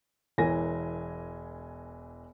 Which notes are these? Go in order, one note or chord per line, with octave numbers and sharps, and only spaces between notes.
E1 E3 A#4 G#5 A#6